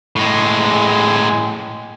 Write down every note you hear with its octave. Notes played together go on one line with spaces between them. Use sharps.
A2 G#3